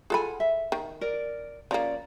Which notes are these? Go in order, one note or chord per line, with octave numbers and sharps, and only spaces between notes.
F4 G#4 A4 F#5 G#5 B5
E5
D#3
A#4 D5
F3 A#3 C#4 D5 A#5